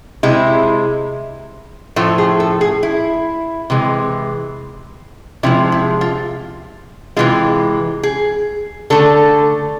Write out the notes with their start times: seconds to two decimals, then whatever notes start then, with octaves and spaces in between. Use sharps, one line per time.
0.23 C3 G#3 E4
1.96 A2 F3 A3 F4
2.18 G#4
2.40 A4
2.61 G#4
2.83 E4
3.70 C3 E3 G#3
5.43 C3 F3 G#3 E4
5.72 E4
6.01 F4
7.16 C3 E3 G#3 F4
8.03 G#4
8.90 D3 A3 A4